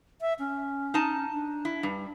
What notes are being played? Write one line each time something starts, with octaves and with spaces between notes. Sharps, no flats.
E5
C#4
D#4 A5
D4
E4
G2